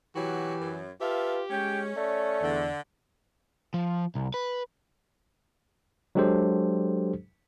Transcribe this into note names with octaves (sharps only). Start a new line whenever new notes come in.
B2 E3 F#3 F#4 G4
F#2
F4 G4 A4 B4 E5 F5
G#3 C#4 G5
A3 D5
E2 D3
F3
C2
B4
F#3 G#3 D4 G4 A4 C5